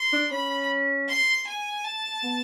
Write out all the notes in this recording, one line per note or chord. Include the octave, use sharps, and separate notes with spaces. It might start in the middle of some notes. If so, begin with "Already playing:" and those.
Already playing: C6
D4
C#4 B5
C6
G#5
A5
B3